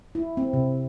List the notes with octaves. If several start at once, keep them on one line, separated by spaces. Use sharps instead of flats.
E4
C4
C3